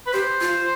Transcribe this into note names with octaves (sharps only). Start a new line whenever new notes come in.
B4
G4 C5
F4